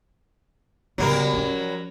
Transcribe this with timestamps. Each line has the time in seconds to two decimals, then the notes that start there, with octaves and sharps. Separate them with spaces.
0.98 C#3 F#3 G3 B3 A#4
1.33 F3 C#4